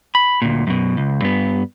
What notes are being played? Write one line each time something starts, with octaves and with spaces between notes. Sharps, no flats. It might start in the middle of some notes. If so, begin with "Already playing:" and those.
B5
D2 A#2
F#2 B2
C#2
G2 B3